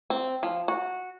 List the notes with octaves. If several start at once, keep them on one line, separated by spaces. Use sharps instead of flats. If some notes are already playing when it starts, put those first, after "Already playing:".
C4
F3
F#4